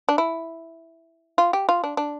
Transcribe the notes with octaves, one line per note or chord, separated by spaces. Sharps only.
D4
E4
F4
G4
F4
D4
D4